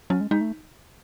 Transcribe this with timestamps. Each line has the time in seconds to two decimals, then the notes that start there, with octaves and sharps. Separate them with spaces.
0.10 F#3 C#4
0.21 G#3
0.31 G#3 D#4
0.41 A3